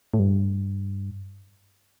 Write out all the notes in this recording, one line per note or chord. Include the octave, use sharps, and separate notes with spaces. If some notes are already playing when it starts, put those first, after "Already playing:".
A2
G2